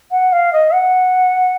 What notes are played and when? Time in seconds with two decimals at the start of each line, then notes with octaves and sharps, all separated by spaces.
0.11 F#5
0.32 F5
0.52 D#5
0.73 F#5